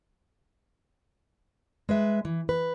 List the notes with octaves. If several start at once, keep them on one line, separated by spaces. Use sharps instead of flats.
G#3 B4 E5
E3
B4